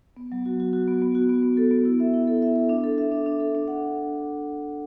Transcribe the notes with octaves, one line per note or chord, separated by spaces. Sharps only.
B3
F#3
F#4
F#4
F#4
B3
B3
F#4
B3
B3
A4
B3
E4
E5
E4
A4
E5
E5
D4
A4
E5
D4
D4
A4
D4
F#5